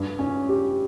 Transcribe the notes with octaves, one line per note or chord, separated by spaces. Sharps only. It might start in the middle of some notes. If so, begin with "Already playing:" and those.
Already playing: G2
C#4
G4